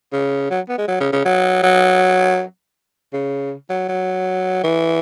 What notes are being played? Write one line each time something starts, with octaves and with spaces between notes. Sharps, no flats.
C#3
F#3
B3
G#3
F#3
C#3
C#3
F#3
F#3
C#3
F#3
F#3
E3